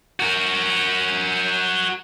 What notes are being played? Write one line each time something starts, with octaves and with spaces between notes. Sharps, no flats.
F#4 A#4